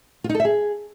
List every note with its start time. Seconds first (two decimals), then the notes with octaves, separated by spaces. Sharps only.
0.24 F4
0.29 D#4
0.35 A4
0.40 E5
0.45 G#4